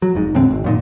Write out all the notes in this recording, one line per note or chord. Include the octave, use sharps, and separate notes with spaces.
F#3
F1 G#2
E1 A2 D3 C4
G#1
F#2 A#2 D#3